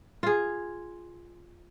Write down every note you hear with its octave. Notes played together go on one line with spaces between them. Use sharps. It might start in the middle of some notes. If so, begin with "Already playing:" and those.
F4 G#4